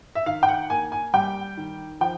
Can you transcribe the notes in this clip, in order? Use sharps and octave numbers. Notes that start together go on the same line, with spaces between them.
E5
D#3 F5
G5
F#5
A#3 G#5
G#5
G3 G5
D#3
F3 G5